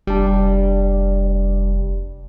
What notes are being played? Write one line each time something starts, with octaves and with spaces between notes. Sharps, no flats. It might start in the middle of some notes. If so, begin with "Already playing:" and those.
F1 G3 D4